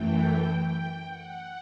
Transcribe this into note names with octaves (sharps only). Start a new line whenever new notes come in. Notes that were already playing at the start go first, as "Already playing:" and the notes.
Already playing: F#2 E3 A3 G5
G5
F#5